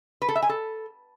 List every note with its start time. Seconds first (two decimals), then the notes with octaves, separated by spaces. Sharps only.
0.22 B4
0.29 A4
0.35 E5
0.42 G#5
0.49 A4